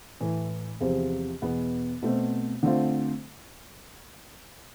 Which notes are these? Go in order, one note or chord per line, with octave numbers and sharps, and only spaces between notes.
A2 E3 A3
E2 C3 F3
E2 B2 B3
B2 A3 C4
D3 A3 C4 F4